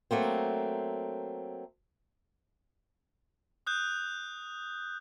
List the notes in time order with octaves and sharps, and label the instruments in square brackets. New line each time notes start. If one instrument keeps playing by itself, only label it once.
[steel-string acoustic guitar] F#3 A3 A#3 C4
[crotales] D#6 F#6 G6